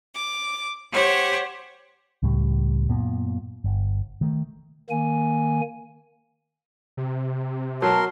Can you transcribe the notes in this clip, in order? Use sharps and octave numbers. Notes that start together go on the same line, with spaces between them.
D6
G4 C5 C#5 F#5
C#2 A2 G3
F#2 A#2 A#3 B3
G1
D#3 A3
D#3 A#3 G#5
C3
B2 F#3 A#4 A5 C6